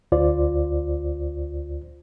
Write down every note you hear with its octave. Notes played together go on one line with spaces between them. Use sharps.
D2 F4 C5 D5